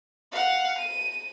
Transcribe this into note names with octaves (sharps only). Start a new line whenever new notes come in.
F5 F#5
D#7